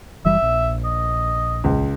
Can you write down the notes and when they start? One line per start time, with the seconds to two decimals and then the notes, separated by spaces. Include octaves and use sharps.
0.25 F#1 E3 G3 E5
0.42 A#1
0.85 D#5
1.64 C#2